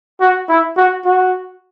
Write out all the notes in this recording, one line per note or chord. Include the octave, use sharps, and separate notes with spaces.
F#4
E4
F#4
F#4